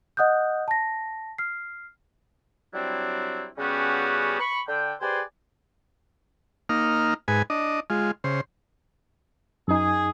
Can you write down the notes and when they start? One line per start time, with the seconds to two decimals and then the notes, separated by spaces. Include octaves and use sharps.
0.17 D#5 F#5 D#6 F#6 G6
0.68 A5 A#6
1.38 F6 C7
2.74 F#3 G3 C4 D4 E4
3.58 C#3 G3 B3 C#4 F#4 G4
4.40 B5 C#6
4.68 D3 G5
5.01 G4 G#4 B4 C5 D5 G#5
6.69 A#3 D#4 F6
7.28 G#2 B4 G#5
7.50 D4 D#5
7.90 G#3 F4
8.24 C#3 C5
9.68 F#2 D#4 G#4